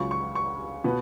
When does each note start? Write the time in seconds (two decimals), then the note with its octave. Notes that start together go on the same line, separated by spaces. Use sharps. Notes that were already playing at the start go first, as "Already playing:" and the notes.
Already playing: C#2 C#3 F#3 C#6
0.11 C#6
0.35 C#6
0.84 B2 B3